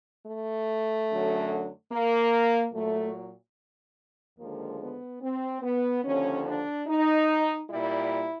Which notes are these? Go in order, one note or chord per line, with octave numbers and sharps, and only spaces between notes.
A3
F#2 D3 F#3
A#3
A#2 F#3 A3
D#2 D3 F3 G#3 A#3
B3
C4
B3
D#2 D3 F3 C#4
D4
D#4
A#2 G3 E4